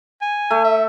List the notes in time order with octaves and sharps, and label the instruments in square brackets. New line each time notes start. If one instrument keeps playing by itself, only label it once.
[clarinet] G#5
[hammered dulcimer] A3
[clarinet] E5